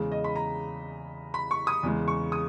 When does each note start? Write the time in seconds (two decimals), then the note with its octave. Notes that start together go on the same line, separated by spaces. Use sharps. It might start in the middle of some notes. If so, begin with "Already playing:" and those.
Already playing: E2 C#3 G#3
0.12 D#5
0.24 B5
0.36 A#5
1.34 B5
1.51 C#6
1.67 D#6
1.83 E2 C#3 G#3
2.08 C#6
2.32 D#6